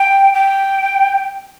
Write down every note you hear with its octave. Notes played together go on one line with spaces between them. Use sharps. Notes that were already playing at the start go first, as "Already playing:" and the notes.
Already playing: G5
G5